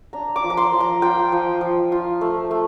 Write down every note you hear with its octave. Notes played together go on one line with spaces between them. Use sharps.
D4 A#5
D6
F3
A#5
C6
F3
A#5
F4 G5
F3
F3
F4
A3
A3